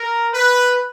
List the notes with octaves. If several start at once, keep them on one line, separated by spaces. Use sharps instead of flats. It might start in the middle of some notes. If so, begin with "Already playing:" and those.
Already playing: A#4
B4